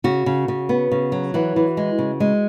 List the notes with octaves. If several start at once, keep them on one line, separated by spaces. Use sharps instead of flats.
C#3 F#4
C#3
C#3
B3
C#3
F#3
E3 F#4
E3
G#3
C#3
G#3